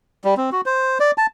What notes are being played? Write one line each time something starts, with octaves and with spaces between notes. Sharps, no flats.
G3
C4
F#4
C5
D5
A5